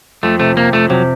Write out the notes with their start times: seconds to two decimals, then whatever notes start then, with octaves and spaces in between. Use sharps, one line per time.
0.23 F2 A3
0.40 C3 A3
0.57 C3 A#3
0.73 F2 A3
0.90 C3 F#3